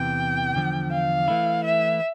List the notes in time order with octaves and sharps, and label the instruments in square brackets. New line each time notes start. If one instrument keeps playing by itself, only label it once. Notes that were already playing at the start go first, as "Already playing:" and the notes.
Already playing: [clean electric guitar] E2 C3 E3 [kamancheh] G5
[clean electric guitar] E2 D3 F3
[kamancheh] F5
[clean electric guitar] E3 A3 E4
[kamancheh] E5